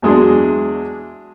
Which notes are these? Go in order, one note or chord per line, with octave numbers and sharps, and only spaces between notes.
E2 F#3 G#3 D4 G#4 C6